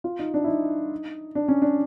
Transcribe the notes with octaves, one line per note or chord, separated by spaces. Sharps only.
F4
D#4
D4
E4
D#4
D4
C#4
D4